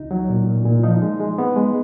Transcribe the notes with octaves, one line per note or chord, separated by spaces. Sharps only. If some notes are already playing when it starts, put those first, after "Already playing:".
Already playing: C#2 D#4
F#3
A#2
A#2
A#2
F3 D#4
G#3
G#3
B3
G#3